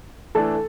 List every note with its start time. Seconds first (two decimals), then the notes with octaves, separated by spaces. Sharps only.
0.35 E3 A3 D4 A4 A5